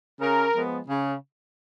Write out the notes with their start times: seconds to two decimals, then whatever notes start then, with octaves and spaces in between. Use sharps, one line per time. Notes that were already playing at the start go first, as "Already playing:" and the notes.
0.21 C#3 A#4
0.54 F3 G#3 B3
0.87 C#3